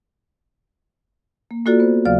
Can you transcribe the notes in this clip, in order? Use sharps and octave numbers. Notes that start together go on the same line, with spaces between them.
A#3
A#3 F4 F#4 A4 D5
B3 C5
D#2 C#3 F#3 D5 F5 F6